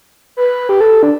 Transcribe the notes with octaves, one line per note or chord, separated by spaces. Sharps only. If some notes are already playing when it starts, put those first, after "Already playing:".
B4
G4
A4
D4